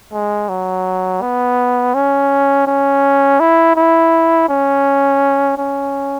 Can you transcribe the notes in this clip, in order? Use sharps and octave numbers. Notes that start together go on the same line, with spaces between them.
G#3
F#3
B3
C#4
C#4
E4
E4
C#4
C#4